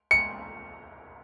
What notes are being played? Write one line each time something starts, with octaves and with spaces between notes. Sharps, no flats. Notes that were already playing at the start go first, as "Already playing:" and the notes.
C#7